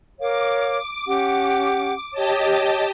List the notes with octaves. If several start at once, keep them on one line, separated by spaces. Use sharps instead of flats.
A#4 C#5 F5 D6
C#4 G4 F#5
G4 C#5 D#5 A5